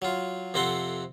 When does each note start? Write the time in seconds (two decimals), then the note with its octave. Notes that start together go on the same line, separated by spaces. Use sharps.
0.02 F#3 F4
0.54 F2 C3 C4 A4 F#5 C6